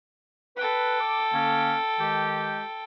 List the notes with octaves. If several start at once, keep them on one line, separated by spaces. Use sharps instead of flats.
A4 B4 G5
D6
D3 A#3 C#4
D#3 G#3 G4